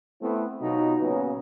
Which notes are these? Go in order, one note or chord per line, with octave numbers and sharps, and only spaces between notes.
A3 B3 C4 E4
B2 F#3 D#4 F4
A#2 C#3 F#3 B3